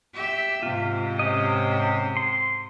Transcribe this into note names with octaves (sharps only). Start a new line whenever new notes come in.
G4 E5
G#2 C3 F4
C#4 G4 D#5
C6